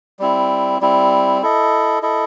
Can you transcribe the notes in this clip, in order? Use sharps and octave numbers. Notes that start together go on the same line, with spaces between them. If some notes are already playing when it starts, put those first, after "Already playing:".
G3 C4 E4
G3 C4 E4
E4 A4 D#5
E4 A4 D#5